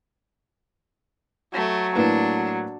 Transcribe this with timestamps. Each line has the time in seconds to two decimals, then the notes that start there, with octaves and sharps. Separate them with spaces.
1.54 F#3 A3
1.95 A2 A#3 D4 B4